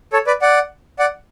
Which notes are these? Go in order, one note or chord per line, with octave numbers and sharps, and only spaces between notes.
A4 C#5
B4 D5
D5 F#5
D5 F#5